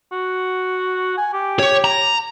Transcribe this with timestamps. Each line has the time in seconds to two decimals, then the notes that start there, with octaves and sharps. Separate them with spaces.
0.12 F#4
1.17 G#5
1.34 G4
1.59 C#5
1.84 A#5